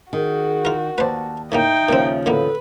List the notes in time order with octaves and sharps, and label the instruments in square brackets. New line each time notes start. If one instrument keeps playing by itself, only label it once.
[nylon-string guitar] D#3 [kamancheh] F#4 [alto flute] G#4
[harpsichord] F4 A#4
[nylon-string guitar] D#2 D5 [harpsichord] B4 C5 [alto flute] A5
[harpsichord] A2 C#3 A#3 [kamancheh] D#4 G5 [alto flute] E5
[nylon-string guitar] D#2 C#3 F3 [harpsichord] A#2 C4
[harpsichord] A2 D3 A#3 [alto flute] A4 [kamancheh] B4